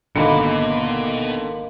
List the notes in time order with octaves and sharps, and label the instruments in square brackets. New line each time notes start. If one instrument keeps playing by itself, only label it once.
[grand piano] G#1 C#7 [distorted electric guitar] B2 [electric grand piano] D3 [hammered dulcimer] G3 A#3